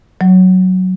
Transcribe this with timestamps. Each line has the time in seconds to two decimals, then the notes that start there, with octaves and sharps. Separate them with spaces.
0.21 F#3